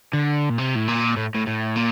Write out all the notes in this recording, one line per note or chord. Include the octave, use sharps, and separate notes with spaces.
D3
A#2
C3
A2
A#2
A2
A2
A2
A#2